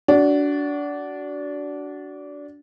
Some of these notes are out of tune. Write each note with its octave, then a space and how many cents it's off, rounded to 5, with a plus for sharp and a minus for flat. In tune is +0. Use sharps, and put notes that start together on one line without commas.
D4 -20 F#4 +15